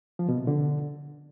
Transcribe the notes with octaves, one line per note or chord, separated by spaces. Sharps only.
F3
B2
C3
D3